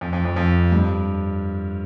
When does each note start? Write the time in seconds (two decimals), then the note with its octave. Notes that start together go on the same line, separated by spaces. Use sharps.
0.01 F2
0.13 F2
0.25 F2
0.36 F2
0.72 G2